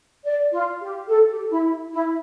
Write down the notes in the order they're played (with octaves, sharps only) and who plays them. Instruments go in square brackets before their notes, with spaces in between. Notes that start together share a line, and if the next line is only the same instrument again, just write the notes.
[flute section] D5
F4
G4
A4
G4
E4
E4